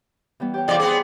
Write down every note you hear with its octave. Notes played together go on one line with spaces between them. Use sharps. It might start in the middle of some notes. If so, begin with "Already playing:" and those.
E3 G3 B3
G4 C#5 G5
E2 C3 E4 C5 D5
B3 C4 G#4